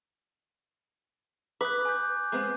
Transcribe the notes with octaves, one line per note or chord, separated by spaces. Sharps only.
B4 D6 D#6 F#6
G#5 G6
G#3 B3 C4